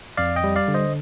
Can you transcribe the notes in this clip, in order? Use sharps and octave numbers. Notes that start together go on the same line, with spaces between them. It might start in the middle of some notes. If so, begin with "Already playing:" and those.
F2 D5 F5
D#5 G5
G3
D5 F5
D3
C5 D#5